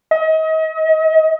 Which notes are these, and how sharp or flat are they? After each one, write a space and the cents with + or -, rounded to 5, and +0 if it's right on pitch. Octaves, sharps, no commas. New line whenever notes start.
D#5 +35